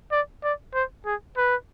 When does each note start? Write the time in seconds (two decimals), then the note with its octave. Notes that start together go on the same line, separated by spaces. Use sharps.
0.12 D5
0.43 D5
0.75 C5
1.06 G#4
1.37 B4